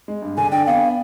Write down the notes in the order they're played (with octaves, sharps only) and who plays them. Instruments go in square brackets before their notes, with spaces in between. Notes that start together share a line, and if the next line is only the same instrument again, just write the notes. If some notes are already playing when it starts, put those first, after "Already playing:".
[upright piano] G#3
G2
[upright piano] D3 [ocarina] G#5
[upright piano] D4 [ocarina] G5
[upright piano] B3 [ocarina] F5